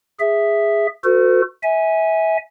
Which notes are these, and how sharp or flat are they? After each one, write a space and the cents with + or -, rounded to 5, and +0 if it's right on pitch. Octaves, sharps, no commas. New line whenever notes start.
G#4 -10 E5 +0
F#4 -25 A4 +35 C5 -45
E5 -25 G#5 +0